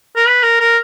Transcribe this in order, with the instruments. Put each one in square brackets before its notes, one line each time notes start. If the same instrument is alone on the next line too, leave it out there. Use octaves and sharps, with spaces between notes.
[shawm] A#4
B4
A#4
A#4